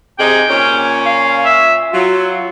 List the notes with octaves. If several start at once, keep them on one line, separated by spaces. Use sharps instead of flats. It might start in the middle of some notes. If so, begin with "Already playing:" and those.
C3 D#4 G#4 G5
A#2 C#4
F5
E5
F#3 F4